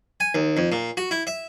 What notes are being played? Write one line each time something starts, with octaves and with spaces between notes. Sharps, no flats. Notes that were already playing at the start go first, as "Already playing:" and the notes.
G#5
D#2
F2
A#2
F#4
E4
E5